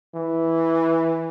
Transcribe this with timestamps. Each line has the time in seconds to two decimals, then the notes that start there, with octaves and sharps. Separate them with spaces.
0.15 E3